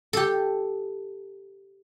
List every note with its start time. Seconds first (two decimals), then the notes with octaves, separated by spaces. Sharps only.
0.13 G4 A4